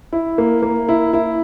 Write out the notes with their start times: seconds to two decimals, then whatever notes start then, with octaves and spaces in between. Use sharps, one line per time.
0.13 E4
0.38 A#3
0.62 A#3
0.89 E4
1.13 E4